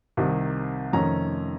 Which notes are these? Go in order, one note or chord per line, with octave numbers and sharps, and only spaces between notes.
C2 C3 D#3
F1 F2 D#3 A3 C#4 A#5